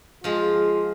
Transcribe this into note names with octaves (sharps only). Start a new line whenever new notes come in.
F3 G#3 F4